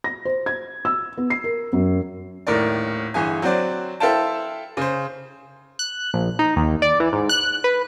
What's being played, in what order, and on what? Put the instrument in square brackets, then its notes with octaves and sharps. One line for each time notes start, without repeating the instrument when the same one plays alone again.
[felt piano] A#6
C5
G#6
E6
B3
C7
A#4
F#2
[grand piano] D#1 A2 D#3 A#4 D5
G1 E3 G#4 G#5
F#3 C4 F#4 C5 D5
E4 A4 C5 F5 G5 A5
C#3 C5
[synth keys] F#6
A#1
D#4
D#2
D5
E3
G#2
F#6
B4